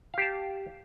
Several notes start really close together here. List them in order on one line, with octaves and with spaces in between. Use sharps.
F5 G4 A5